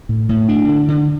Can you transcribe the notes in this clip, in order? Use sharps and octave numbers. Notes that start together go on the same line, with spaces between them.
A2
A2
D4
D3
D3